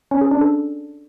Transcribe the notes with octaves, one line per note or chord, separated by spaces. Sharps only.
C#4
G#4
D4
A4